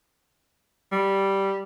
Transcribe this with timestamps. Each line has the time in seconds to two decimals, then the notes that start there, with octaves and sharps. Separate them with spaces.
0.92 G3